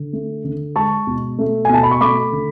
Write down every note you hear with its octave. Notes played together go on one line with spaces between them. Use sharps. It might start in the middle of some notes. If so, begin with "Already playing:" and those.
Already playing: D3
A3
D3
G#3 A5 C#6
B2
A3
G#5
B2
A5
B5
C#6
A3 B5 D6
D3